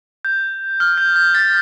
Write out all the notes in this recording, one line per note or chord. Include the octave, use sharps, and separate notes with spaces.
G6
F6
G6
G6
A6